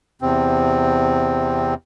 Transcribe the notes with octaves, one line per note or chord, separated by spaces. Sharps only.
E2 C3 C4